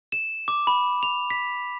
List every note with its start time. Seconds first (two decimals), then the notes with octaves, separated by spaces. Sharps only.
0.12 E7
0.48 D6
0.67 B5
1.03 F7
1.30 B6